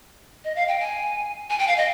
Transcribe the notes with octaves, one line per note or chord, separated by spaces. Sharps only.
D#5
F5
G5
G#5
G#5
G5
F5
D#5